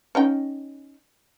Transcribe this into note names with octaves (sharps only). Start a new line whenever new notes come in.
C#4 D#4 G5